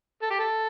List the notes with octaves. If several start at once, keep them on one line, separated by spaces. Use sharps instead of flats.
A4
G4
A4